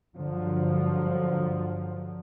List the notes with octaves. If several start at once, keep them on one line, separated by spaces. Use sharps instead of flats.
G2 D3 F3 F#3